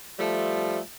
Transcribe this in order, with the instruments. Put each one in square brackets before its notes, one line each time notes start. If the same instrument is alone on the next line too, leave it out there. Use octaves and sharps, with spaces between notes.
[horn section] F3 G3 A3